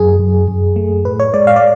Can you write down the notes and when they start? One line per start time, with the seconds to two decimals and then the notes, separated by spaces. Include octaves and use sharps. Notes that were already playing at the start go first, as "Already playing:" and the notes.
Already playing: F#2 G#4
0.19 F#2
0.48 F#2
0.76 A3
1.05 A2 B4
1.20 C#5
1.34 G#3 D5
1.47 F5
1.56 D5